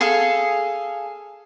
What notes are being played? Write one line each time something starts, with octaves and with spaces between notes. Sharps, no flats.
G#4 A4 F5